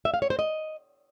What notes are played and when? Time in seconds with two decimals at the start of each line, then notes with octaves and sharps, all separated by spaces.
0.05 E5
0.14 F5
0.22 C#5
0.30 C5
0.39 D#5